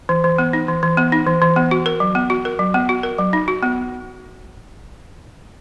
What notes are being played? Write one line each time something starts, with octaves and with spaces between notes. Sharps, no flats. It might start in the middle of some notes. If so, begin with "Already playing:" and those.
E3
E3
B3
D#4
E3
E3
B3
D#4
E3
E3
B3
F#4
A#4
F#3
B3
F#4
A#4
F#3
B3
F#4
A#4
F#3
D#4
F#4
B3